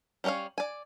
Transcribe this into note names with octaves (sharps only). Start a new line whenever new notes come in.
G3 C#4 A#4 C#5 F5
D5 G#5